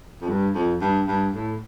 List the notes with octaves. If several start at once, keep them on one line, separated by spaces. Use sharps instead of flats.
F2
G2
F2
G2
G2
A2